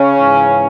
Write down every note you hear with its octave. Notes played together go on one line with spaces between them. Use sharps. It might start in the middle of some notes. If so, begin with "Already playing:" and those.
Already playing: C#3 C#4
G#2 E3